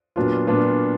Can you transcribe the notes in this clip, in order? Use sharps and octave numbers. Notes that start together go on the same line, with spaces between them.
A#2 F#3 B3 D4 F4
A#2 F#3 B3 D4 F4